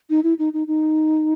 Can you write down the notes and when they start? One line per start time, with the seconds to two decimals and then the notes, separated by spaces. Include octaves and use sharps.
0.10 D#4
0.24 E4
0.39 D#4
0.53 D#4
0.67 D#4